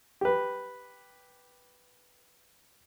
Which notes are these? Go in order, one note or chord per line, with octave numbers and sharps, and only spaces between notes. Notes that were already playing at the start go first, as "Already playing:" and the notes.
G4 B4